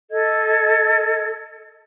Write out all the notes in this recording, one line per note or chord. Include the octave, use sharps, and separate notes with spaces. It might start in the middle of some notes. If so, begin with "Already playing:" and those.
A4 D#5 G#6